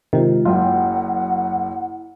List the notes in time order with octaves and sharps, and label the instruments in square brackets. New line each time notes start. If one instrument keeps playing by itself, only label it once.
[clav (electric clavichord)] C3 D#3 [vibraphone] G#3 F4
[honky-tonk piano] F#1 F#2 G5 [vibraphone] E4 [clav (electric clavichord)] F4 [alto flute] F#5